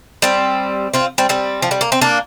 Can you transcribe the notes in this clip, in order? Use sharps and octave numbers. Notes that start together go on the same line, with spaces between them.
G3 C4
C4 F4
G3 C4
G3 C4
F3
G3
A#3
C4
A#3 D4